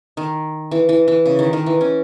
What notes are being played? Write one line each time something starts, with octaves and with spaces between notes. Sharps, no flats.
D#3
E3
E3
E3
C#3
D#3
D#3
E3
C#4